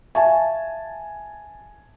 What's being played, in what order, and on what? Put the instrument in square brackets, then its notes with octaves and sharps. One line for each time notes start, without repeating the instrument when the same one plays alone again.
[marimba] E5 F5 C#6 [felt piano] G#5 A5